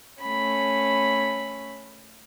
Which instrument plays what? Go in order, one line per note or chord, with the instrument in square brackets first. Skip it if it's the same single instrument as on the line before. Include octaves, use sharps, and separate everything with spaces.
[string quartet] A3 C#4 B5